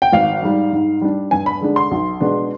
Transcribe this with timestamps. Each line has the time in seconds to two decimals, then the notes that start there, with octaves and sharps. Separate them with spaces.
0.02 G5
0.12 G#1 F5
0.42 G#2 G3
0.73 G#2
1.01 G3 D4
1.31 G2 G#5
1.46 B5
1.61 D3 G#3 D4
1.76 C6
1.91 B1
2.20 B2 G#3 B3 D4